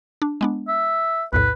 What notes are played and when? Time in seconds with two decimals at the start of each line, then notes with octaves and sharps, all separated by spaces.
0.22 D4
0.41 G#3 B3 D4
0.68 E5
1.33 B1 E2 A2 B4